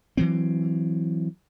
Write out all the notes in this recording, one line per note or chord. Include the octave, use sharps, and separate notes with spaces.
E3 F#3 C4